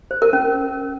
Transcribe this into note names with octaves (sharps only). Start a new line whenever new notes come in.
C5
A#4
C#4